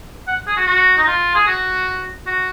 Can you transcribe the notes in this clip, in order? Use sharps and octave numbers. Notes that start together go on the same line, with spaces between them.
F#5
G#4
F#4
F#4
D#4
F4
G#4
F#4
F#4